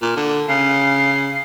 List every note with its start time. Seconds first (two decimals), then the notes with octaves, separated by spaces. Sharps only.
0.02 A#2
0.17 D3
0.49 C#3 C7